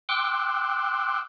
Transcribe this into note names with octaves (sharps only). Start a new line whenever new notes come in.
G5 C6 D6 E6 F#6